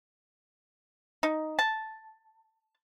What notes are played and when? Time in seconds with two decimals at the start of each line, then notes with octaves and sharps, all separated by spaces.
1.23 D#4
1.59 A5